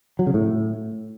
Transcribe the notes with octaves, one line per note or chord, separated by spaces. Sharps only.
F#3
C#3
A2